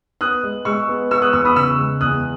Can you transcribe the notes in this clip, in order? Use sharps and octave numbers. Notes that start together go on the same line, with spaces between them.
B3 D#6 F#6
G#3
G#3 C#6 E6
B3
B3 C#6 E6
D#6 F#6
E2 C#6 E6
B5 D#6
C#3 C#6 E6
G#3
E2 D#6 F#6